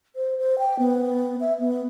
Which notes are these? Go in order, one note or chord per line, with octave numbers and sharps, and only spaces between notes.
C5
C5
G5
B3
E5
B3